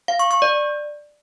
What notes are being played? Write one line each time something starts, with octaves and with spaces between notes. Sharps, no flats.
F5
C#6
C#6
D5